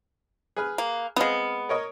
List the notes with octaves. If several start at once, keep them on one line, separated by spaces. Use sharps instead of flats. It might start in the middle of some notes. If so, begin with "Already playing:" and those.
G#4 B4 F6
A#3
G#3 B3 C4 B4 F5
A#4 C#5 D#5